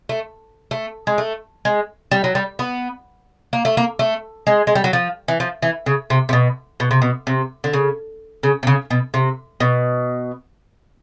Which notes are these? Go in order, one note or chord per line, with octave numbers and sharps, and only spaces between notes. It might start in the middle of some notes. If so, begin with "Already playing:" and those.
A3
A3
G#3
A3
G#3
G3
F#3
G3
B3
A#3
A3
A#3
A3
G#3
G#3
G3
F#3
F3
E3
F3
E3
C#3
C3
C3
B2
B2
C3
B2
C3
D3
C#3
C#3
C3
C#3
B2
C3
B2